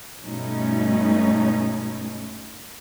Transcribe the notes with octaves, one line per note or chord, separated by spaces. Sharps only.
G2 B2 A3 C#4 D#4